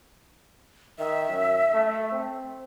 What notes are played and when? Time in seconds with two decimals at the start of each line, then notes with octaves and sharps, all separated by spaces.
0.99 D#3 E5
1.29 F#2
1.74 A3
2.12 C4